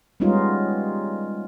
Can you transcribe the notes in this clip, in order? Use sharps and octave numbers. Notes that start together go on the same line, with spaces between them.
G3 G#3 B3 C#4 D#4 F4